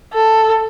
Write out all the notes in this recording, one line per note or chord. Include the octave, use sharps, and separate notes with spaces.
A4